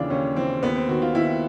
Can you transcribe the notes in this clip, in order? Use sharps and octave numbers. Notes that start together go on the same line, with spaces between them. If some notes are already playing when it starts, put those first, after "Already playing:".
Already playing: D#2 C#3 E3 D4 F4
D#2 C#4
C#3 E3 C4
D#2 B3
C4
D#3 F#4
F4
D#2 E4